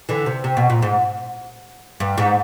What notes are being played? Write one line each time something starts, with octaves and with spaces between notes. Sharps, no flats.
D3 E3
C3
C3
B2
A#2
G#2
G2
G#2